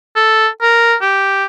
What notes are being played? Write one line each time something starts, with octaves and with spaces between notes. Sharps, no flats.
A4
A#4
G4